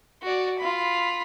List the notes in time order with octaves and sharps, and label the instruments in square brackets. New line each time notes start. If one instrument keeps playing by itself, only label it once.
[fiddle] F#4 D5
F4 B5